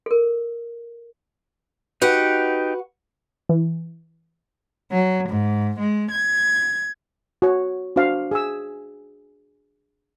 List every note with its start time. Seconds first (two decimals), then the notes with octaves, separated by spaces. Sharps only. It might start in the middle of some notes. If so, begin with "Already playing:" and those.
0.06 A4 A#4
2.02 D#4 F#4 G4 B4 F#5
3.49 E3
4.92 F#3
5.28 G#2
5.79 G#3
6.10 G#6
7.42 F#4 C#5
7.96 D4 F#4 C5 F5
8.31 G#4 G#5 E6